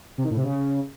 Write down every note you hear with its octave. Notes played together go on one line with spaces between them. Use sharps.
C3
D#3
A2
C3
C#3